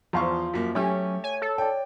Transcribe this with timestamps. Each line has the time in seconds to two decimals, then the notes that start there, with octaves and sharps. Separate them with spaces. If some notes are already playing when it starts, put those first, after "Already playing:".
0.13 E2 F3 F5 C6 C#6
0.54 F#2 A#3 B6
0.75 F#3 A3 C#4 G4
1.24 C#5 G#5
1.42 A4
1.58 C#5 D5 G5